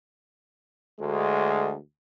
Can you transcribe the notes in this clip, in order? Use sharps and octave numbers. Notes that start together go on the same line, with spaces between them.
D2 G#3